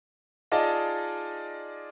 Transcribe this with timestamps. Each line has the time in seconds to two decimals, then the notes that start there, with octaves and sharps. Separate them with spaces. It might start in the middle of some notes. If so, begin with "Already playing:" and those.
0.52 D#4 F4 G#4 D5 D#5 A5